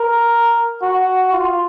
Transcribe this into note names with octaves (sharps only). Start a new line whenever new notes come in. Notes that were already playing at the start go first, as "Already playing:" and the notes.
Already playing: A#4
F#4
F4